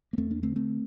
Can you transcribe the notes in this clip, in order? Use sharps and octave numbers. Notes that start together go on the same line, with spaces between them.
A#3
E2 A3 C4
A#3 D4
D3 A3 C4
A3 C4